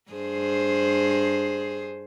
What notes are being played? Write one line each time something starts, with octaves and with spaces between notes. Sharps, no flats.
G2 G#4 C5